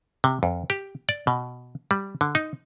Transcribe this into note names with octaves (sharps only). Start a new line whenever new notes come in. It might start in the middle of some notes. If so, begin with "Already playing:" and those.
C3
F2
G4
D5
B2
G3
D3
D#4